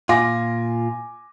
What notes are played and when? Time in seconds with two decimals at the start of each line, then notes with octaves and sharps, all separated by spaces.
0.09 A#2 F4 G#5 D6 A#6